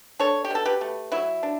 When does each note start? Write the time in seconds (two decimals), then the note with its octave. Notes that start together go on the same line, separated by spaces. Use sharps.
0.19 D4 A4 C#5
0.44 G4
0.51 B2 A4
0.65 G4 B4
0.81 A3
1.12 F#3 E4
1.43 D4